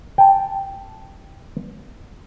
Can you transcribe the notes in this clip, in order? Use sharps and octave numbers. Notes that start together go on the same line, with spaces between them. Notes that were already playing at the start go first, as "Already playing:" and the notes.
G5 A5